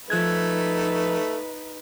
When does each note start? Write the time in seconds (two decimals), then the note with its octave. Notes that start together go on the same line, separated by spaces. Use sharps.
0.10 F3 A3 D#4 B4 F#6 G#6